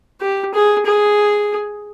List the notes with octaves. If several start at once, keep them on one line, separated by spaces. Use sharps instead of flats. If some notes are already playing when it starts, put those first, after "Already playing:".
G4
G#4
G#4